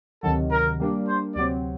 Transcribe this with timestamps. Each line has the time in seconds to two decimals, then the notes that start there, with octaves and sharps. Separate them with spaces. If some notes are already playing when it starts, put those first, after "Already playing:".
0.23 D2 C3 D#3 F#3 A4
0.51 A#4
0.80 G3 A#3 D4
1.08 C5
1.35 D2 C3 F#3 C4 D5